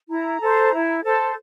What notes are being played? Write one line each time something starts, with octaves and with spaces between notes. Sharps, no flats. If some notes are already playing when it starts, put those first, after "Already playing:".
E4 A#5
A4 C5
E4
A4 C5